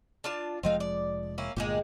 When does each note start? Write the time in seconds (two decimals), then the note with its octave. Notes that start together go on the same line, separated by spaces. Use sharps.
0.24 D4 F4 A5
0.63 F1 F3 G#3 C4 D#4 F5
0.80 D5
1.38 A#3 C#4 E4
1.57 G1 A#2 G#3 A#3 G4